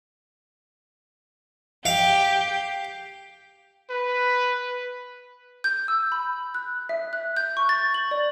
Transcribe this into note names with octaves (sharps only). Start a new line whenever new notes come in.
G4 F5
B4
G6
E6
B5
F#6
E5
F#6
G6
C#6
A6
F#7
D5